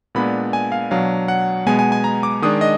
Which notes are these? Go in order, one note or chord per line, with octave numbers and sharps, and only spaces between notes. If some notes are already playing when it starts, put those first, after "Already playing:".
A#2 G#3 B3 D4 B5
G#5
F5
B2 F#3 D4 F5
F#5
B2 G#3 B3 G#5
G#5
G#5
A#5
D6
D#3 G#3 D4 D#6
D#5